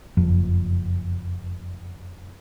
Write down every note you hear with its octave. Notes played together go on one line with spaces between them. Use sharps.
F#1 F2